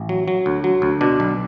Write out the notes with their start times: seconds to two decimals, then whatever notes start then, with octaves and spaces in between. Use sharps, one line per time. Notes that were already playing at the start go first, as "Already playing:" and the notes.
Already playing: A1
0.09 F#3
0.28 F#3
0.46 D2
0.64 F#3
0.82 D2
1.01 B2 D4
1.20 B1